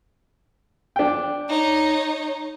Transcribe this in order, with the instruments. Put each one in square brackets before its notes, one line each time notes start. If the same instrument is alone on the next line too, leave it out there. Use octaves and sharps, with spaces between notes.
[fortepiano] D4 G5
[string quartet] D#4 C#5